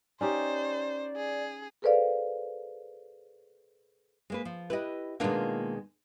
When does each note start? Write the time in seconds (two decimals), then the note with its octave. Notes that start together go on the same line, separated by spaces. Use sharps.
0.21 C#4 D#4 G4 C5 D5
1.16 G#4
1.82 G#4 A4 B4 C5 D5 F5
4.30 G#3 A#3 B4
4.45 F3
4.70 E4 G4 B4 D#5
5.20 B2 D#3 G#3 A#3 D4 F4